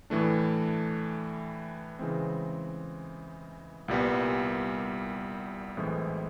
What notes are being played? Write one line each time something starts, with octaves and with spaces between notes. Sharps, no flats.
A2 E3 A3 D4
C#3 E3 G#3 C4
C2 A#2 G3 B3
B1 A2 E3 G#3 C4